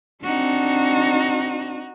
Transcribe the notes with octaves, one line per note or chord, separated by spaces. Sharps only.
C4 D4 D#4 F#4